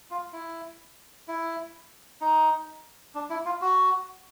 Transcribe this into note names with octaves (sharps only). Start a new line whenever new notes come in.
F4
E4
E4
D#4
D4
E4
F4
F#4